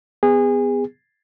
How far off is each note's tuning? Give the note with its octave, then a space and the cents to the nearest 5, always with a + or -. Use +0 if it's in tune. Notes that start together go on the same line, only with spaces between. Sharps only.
B3 +20 G#4 -25